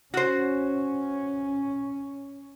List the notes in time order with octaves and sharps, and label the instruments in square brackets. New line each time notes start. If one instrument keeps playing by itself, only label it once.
[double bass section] C#4 [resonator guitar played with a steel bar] F#4 C5